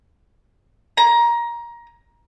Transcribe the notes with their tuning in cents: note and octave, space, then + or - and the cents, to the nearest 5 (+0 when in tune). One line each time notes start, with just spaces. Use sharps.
A#5 +20